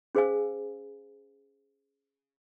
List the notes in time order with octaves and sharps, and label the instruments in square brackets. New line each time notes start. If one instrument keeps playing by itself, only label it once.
[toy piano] C#4 G#4 C5 F5 G#5 E6